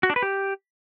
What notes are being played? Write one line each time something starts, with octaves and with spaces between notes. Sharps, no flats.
F#4
D4
B4
G4